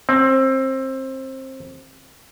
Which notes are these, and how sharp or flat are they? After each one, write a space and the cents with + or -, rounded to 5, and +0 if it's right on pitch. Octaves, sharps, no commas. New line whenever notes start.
C4 +20